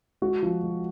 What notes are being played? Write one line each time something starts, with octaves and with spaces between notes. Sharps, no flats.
G#3 F#4
F3
G#3